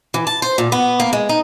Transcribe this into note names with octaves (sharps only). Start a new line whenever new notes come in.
E3
A5
C5
A#2
B3
A#3
G#3
D#4